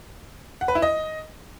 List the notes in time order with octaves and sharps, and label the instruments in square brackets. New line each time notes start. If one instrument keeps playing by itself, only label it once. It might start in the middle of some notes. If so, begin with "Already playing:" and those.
[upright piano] F#5
B4
E4
D#5